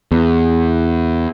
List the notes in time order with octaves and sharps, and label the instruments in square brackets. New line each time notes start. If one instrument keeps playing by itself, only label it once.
[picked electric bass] E2